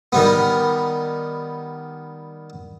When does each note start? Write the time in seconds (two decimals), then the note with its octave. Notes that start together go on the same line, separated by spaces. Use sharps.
0.12 D#3 G3 B3